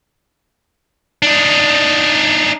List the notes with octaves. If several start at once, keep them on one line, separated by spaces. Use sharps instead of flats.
D4 D#4